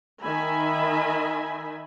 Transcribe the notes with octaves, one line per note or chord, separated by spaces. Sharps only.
D#3 D#5 E5 G#5 B5